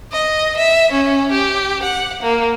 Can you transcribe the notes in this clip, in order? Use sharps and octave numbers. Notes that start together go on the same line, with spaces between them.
D#5
E5
C#4
G4
F#5
A#3